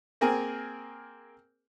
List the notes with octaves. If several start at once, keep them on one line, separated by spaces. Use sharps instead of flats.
A#3 C4 G#4 A#4 G#5